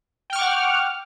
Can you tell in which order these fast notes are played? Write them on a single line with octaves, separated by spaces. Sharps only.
G5 F6 C#6 D6 F#5